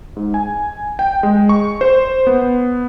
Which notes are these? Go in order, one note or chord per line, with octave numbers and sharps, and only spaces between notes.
G#2
G#5
G5
G#3
C#6
C5
B3